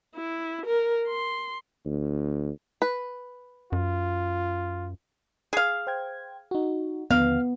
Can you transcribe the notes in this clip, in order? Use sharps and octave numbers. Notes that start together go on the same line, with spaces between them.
E4
A#4
C6
D2
B4
F#2 F4
G#4 F5
C5 G5 G#6
D#4 F#4
D#2 D3 F3 B3 F5